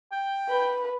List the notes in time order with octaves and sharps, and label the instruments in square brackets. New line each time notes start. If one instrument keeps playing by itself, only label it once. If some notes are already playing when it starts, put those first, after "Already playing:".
[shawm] G5
[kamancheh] B4